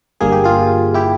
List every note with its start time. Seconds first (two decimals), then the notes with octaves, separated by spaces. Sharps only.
0.21 G1 G2 G3 A#3 G#4
0.32 G4
0.44 F4 G#4
0.94 E4 G4